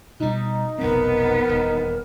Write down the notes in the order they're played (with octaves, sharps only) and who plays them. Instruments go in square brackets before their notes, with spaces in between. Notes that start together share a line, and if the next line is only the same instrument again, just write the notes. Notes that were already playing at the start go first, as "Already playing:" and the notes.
[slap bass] B2 G3 [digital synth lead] D#4
[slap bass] F1 B1 C4 [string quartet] B3 [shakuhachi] A#4
[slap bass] D#1 E2